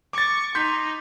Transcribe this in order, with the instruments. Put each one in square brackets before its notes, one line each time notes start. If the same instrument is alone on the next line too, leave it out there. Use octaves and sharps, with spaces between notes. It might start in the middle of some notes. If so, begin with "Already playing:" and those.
[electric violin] C#6 [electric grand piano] D6 A6
[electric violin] D#4 [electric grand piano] C6 G6 B6